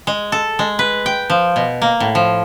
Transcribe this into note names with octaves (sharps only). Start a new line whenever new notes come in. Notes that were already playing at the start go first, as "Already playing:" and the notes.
G#3
A4
G#3
B4
G5
F3
B2
A#3
A2
F3